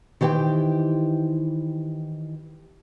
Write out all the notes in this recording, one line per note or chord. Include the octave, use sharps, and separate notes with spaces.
D#3 E3 G4 C5 G5